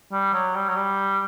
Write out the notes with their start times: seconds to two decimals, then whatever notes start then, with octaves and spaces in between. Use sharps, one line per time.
0.12 G3
0.33 F#3
0.55 G3
0.68 F#3
0.76 G3